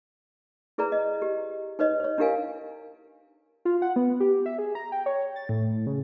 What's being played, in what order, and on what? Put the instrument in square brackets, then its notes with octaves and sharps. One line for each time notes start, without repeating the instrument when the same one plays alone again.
[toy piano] E4 G#4 B4 D5 A#5
D#5
G4
D#4 B4 C#5 D#5
C5 C#5
D4 E4 G4 A#4 F5 G#5
[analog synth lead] F4
F#5
B3
G4
E5
G#4
A#5
G5
C#5
A6
A2
C#3